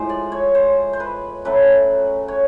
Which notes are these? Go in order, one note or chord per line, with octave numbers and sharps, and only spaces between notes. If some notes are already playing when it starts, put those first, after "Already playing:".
Already playing: A2 F3 G#3 C5
D5
C#5
C5
C5
B4
C#3 F#3 A3 B4
C#5